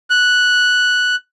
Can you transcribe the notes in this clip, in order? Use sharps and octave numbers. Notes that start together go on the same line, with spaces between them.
F#6